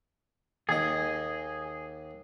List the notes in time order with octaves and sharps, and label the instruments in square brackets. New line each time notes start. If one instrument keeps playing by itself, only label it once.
[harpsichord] D#2 D#5 [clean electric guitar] G#4